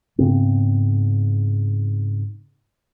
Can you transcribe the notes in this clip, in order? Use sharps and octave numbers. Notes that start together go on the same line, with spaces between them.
G#2 C#3 B3 C4